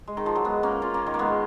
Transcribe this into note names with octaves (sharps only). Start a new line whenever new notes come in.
G#3
D#3
F3
F#3
G#3 B3
A#3 C#4
C#4 F4
A#3 C#4
D#3
A#3
G#3 B3